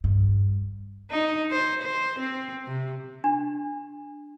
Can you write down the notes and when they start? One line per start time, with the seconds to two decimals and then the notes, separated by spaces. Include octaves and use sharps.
0.04 G2
1.11 D#4
1.51 C5
1.82 C5
2.19 C4
2.67 C3
3.24 D4